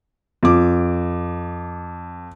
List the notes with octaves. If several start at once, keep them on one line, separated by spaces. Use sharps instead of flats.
F2 D6